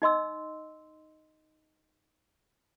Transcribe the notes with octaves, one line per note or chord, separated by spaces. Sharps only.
D#4 D#5 C6 E6